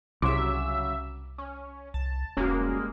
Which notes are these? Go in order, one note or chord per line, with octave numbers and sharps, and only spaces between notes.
C2 C#3 F#3 E5 C6 D6
C#4
C2 A5
E1 G2 G#3 A#3 C#4 F#4